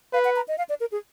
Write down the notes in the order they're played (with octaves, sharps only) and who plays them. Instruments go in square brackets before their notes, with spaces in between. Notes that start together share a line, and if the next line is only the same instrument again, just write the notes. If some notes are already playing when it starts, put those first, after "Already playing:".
[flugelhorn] B4 [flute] F5
[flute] F#5
A#5
D#5
F5
D5
A#4
G#4